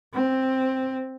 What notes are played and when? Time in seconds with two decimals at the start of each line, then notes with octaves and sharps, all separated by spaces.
0.13 C4